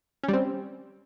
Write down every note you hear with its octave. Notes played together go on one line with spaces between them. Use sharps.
G3 C4 C#4